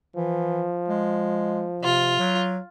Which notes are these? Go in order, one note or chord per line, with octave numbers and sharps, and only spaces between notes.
E3 F3
G#3
C3 F4
F#3